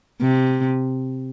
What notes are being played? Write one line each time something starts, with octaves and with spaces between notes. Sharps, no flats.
C3